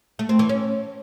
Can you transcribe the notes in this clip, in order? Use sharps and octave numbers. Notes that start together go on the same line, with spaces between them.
A3
C4
E3
C#4